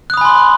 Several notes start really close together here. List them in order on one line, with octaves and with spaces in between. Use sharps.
F#6 D#6 B5 G#5 C6